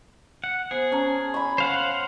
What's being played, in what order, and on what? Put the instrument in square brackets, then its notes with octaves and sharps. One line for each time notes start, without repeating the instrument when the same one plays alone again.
[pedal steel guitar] F#5
[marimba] B3 C5 [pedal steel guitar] G#4
[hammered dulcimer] C#4 [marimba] A5 A#5
[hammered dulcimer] B5 C#6
[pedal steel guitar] C5 F5 F#5